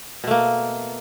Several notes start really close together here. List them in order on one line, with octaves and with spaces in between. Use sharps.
B2 A3 A#3